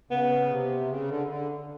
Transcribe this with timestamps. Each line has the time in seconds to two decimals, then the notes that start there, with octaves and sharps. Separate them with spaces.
0.10 C#3 B3
0.50 C3
0.89 C#3
1.08 D3
1.27 D3